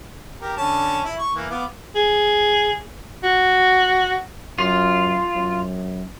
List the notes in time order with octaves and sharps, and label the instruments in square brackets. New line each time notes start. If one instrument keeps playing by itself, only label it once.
[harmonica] G4 A#4
D3 C#4 A5
E4
C#6
E3 A#3
B3 F5 D6
[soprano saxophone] G#4
F#4
[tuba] F#2 [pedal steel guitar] F4
[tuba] F#2